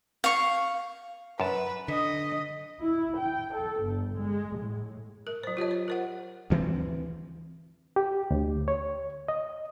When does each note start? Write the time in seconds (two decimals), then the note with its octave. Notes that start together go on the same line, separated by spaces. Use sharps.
0.24 F5 C#6
1.40 F#2 B4 A5
1.88 D3 D#5 D#6 B6
2.81 E4
3.19 G5
3.53 A4
3.82 G1
4.19 G#3
4.59 A2
5.27 A#4
5.43 F#3 C5
5.57 F4 G4 C#5 D#5
5.71 C5
5.88 A#4 C5 F#5
6.50 D2 E3 B3 C4
7.96 G4
8.31 D2
8.68 C#5
9.28 D#5